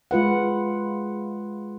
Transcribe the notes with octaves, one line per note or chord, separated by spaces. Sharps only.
G#3 F4 B4 F#5